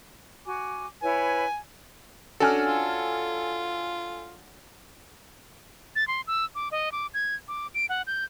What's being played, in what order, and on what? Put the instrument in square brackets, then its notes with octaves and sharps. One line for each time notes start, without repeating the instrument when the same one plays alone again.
[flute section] F#4 G#5 D6
[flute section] E4 B4 C#5 [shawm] G#5
[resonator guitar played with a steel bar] C#4 D4 F#4 [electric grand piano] A4 G#5 F6
[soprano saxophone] F4
[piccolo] A6
C6
E6
D6
D#5
D6
G#6
D6
D7
F#5
G6